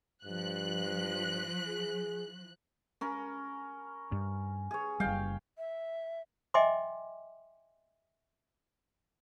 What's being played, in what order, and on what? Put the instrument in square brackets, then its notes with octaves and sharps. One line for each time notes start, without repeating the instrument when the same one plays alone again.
[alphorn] G2 [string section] F3 F#6
[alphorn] G#4
[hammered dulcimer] C#4 A#4 B5
[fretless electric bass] G2
[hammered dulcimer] G#4 C#5
[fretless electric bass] F#1 G3 [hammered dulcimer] F5 G5
[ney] E5
[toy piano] D#5 E5 G5 G#5 C6 D6